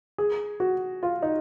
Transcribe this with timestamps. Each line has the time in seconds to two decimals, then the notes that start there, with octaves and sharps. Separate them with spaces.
0.18 G#4
0.60 F#4
1.03 F4
1.22 D#4